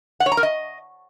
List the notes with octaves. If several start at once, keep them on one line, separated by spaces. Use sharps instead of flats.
F#5
C#5
A#5
A#4
D#5